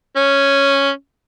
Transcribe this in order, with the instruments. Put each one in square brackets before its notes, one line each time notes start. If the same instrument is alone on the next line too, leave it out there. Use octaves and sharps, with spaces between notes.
[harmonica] C#4